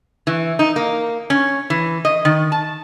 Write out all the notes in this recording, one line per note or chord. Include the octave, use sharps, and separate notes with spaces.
E3
D#4
A#3
C#4
E3
D#5
D#3
A5